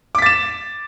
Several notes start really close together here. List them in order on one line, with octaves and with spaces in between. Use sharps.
D6 B6 A6 E7